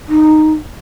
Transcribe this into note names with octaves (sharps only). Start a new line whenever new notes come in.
D#4